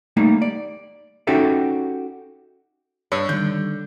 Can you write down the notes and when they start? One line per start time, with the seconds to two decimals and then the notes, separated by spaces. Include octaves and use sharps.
0.17 G3 A3 A#3 D#4
0.42 D5
1.27 C#4 D#4 F#4 G4 A4 E5
3.12 G2 C#5 E6
3.29 D3 D#3 G3 G6